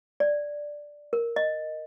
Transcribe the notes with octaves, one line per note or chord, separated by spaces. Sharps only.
D5
A#4
D#5